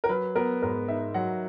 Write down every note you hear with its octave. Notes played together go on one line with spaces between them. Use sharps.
A#4
F#3 B4
B3 A#4
G#2 A#4
D#4 E5
F#3 F#5